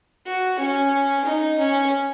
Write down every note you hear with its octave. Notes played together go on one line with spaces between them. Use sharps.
F#4
C#4
D#4
C#4